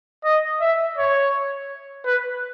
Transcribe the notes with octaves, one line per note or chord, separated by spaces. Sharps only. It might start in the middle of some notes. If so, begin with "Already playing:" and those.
D#5
E5
C#5
B4